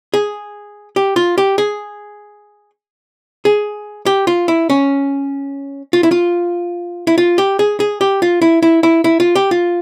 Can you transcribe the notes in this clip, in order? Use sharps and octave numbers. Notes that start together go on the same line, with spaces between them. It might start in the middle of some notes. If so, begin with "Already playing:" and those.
G#4
G4
F4
G4
G#4
G#4
G4
F4
E4
C#4
F4
E4
F4
E4
F4
G4
G#4
G#4
G4
F4
E4
E4
E4
E4
F4
G4
F4